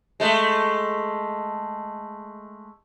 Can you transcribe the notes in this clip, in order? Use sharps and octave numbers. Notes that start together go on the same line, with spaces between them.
G#3 A3